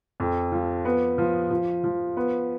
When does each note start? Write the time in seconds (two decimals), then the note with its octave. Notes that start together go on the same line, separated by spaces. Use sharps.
0.20 F2
0.52 F3
0.85 B3
1.18 F3
1.51 F3
1.84 F3
2.17 B3